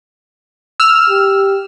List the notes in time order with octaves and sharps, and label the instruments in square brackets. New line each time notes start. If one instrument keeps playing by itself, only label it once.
[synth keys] E6 F6
[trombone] G4